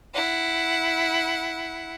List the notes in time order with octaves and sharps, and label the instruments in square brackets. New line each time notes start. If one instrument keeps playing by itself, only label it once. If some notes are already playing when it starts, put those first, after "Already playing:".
[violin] E4 F#5